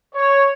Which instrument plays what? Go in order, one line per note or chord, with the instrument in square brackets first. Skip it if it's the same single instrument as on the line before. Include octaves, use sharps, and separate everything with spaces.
[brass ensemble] C#5